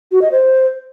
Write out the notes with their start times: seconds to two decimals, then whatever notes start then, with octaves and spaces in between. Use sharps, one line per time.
0.12 F#4
0.22 D#5
0.32 C5